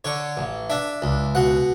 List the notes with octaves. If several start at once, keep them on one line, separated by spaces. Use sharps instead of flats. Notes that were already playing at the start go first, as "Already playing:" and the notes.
D3 C#5
A1
D4 E5
C#2
B2 F#5